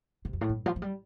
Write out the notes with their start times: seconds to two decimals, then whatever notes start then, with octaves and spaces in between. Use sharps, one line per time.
0.25 C3
0.33 F2
0.41 A2
0.49 G2
0.66 F3
0.76 F3
0.82 G3